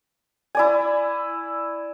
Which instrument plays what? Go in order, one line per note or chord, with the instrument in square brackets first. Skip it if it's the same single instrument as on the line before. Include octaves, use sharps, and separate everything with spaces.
[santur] E4 D5 G#5